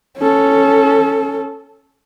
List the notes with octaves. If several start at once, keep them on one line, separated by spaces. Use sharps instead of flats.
C#4 A4